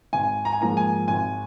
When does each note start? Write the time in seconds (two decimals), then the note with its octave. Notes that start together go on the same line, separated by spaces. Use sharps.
0.13 G#1 G#5
0.45 A#5
0.53 G#5
0.60 G#2 F3 A#3 A#5
0.77 G#5
1.08 G#1 G#5